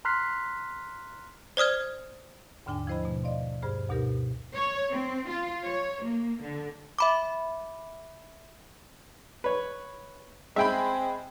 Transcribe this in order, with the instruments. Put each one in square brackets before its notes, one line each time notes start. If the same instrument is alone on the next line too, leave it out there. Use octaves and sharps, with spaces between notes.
[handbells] A#5 C6 F6 F#6 B6 C7
[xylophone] C5 D5 D#6 F6 G#6
[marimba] D#2 G#2 D3 D4 G5 G#5
F3 E4 C5 D#5 B5
B2 A3
D5 D#5 F5 C6
G2 G#4 C5 B5 F6
D2 B2 D#4 G4 A#4
[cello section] C#5
C4
F4
C#5
A#3
D3
[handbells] E5 B5 D6
[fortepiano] B4 C#5
[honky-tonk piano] G#3 G#4 B5 [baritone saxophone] C4 [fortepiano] E5 G5